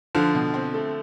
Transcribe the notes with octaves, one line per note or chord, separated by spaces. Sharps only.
D3 F3 F4
B2
C4
A3